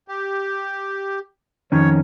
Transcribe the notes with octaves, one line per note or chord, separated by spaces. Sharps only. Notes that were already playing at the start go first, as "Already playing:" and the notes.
G4
F2 D#3 C#4 C#5